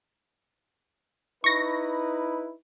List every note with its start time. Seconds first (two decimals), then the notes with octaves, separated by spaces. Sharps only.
1.44 D#4 E4 B4 C#6 A#6